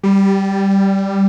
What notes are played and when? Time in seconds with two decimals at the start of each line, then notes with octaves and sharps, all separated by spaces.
0.03 G3